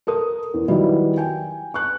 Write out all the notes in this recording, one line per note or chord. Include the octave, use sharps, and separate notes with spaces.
A4 A#4 D#6
E2
D#3 F#3 G3 E4 B4
G5 G#5
C#6 F#6